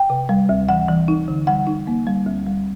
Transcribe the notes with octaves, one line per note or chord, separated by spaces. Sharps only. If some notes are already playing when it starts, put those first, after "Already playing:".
Already playing: G5
C3
G3
D2
E3 F#5
E3
D#4
D3
G3 F#5
D#4
A#3
G3
D2
G3